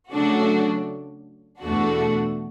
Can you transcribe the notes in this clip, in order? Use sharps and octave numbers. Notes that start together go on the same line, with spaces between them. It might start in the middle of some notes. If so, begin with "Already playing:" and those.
C#3 F#3 A3 D4 F#4
E2 B2 A3 D4 F#4